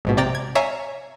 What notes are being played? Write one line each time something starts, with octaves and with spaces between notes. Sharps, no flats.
A#1 G#2 B2
C3 D5 G5 A#5 A6
G#6
C#5 E5 F5 G#5 A#5